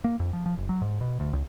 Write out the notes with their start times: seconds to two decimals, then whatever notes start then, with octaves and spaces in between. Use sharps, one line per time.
0.04 A#3
0.20 F2
0.33 F3
0.46 F3
0.57 F#1
0.69 F#3
0.82 G#2
1.01 B2
1.20 D2
1.33 C#2